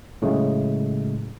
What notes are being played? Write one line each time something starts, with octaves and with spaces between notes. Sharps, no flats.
A2 C#3 F#3 G#3 A3